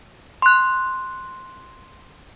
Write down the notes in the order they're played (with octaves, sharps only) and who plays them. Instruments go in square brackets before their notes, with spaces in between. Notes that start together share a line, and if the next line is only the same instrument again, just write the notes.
[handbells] C6 F#6